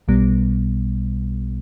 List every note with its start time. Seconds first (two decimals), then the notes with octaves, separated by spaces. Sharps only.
0.08 B1 B2 G3 B3